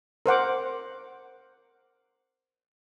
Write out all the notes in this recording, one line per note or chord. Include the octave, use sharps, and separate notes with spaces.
A#4 C5 F#5 D6